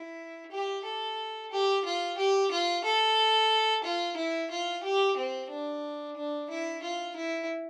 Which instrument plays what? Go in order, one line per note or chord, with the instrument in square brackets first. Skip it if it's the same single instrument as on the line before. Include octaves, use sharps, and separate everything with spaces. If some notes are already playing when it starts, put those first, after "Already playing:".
Already playing: [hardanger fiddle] E4
G4
A4
G4
F4
G4
F4
A4
F4
E4
F4
G4
C4
D4
D4
E4
F4
E4